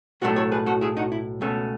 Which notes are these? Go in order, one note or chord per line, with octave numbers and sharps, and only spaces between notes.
B1 A2 F#3 A3 F#4 A4
A4 C#5
G#4 B4
F#4 A4
E4 G#4
D#4 F#4
E4
C#2 B2 A3 C#4